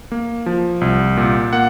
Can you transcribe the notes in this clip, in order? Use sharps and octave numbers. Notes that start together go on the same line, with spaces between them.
A#3
F3
C2
A#2
A#3 F#5